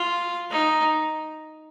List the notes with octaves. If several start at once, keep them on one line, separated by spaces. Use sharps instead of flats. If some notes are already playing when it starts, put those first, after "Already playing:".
Already playing: F4
D#4